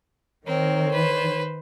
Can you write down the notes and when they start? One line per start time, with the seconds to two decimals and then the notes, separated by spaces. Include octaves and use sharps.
0.46 D#3 C4 A#4 C#5
0.90 B4 C5